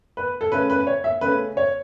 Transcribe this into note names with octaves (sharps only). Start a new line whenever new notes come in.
B4
A4
C#3 A3 C#4 B4
B4
C#5
E5
C#3 A3 C#4 B4
C#5